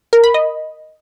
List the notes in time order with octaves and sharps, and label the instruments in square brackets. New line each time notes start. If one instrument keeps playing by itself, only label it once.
[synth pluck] A#4
B5
D#5